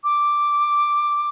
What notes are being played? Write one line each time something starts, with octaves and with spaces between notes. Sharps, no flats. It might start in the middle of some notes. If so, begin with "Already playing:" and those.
D6